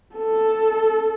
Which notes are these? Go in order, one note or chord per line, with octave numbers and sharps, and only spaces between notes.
A4